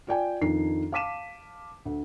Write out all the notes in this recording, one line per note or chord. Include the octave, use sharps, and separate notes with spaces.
F4 D5 G5 G#5
F2 D#3 D4 D#4 C7
F5 A5 D6 B6 D#7 E7
D2